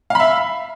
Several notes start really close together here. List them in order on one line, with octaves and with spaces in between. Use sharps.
F5 B5 E5